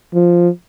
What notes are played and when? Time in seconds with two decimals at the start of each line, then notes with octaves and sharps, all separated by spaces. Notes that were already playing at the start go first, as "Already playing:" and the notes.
0.14 F3